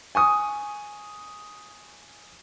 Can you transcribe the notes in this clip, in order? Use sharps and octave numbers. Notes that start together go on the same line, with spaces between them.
G#5 C#6 D#6